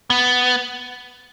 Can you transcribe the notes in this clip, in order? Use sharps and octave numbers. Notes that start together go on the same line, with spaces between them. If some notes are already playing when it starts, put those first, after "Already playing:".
B3